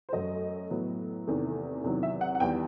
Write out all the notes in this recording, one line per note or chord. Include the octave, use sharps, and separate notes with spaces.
C5
F#2 F#3 A3 D#5
A2 F#3 B3
E2 C3 D#3 A3
E2 C3 D#3 F#3
E5
F#5
F#5
E2 D#3 G3 G5